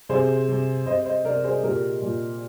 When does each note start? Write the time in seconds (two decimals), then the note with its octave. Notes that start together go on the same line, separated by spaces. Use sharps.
0.09 C3 G#4 C5
0.48 C3
0.86 C3 C5 D#5
1.05 C5 D#5
1.25 C3 A#4 D5
1.44 G#4 C5
1.63 A#2 G4 A#4
2.02 A#2